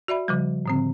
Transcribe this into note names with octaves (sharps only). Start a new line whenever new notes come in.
F#4 D5 E5 B5
C#3 F3 G3
A2 D3 C4